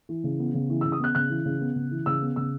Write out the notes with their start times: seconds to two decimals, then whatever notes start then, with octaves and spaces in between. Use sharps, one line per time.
0.09 E3
0.24 C#3
0.39 B3
0.54 C#3
0.70 E3
0.81 C#3 E6
0.92 D#6
1.00 B3 F#6
1.15 C#3 F#6
1.30 E3
1.45 C#3
1.61 B3
1.76 C#3
1.91 E3
2.06 C#3 E6
2.22 B3
2.36 C#3 E6